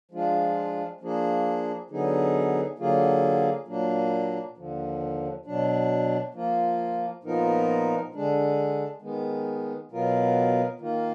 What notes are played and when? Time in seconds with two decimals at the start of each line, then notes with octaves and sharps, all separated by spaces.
0.11 F3 G#3 D4 F4
1.00 F3 A#3 D4 G#4
1.90 D3 F#3 B3 D#4 G#4
2.79 D3 F#3 A#3 F4 G#4
3.67 A#2 F#3 A#3 D4
4.57 D#2 D3 F3
5.46 B2 F#3 D4
6.34 F3 A#3 F4
7.23 A#2 F3 B3 D#4 A#4
8.13 D3 G#3 D4
9.02 D#3 G#3 B3
9.91 B2 F#3 B3 F4 A#4
10.80 D#3 A#3 F4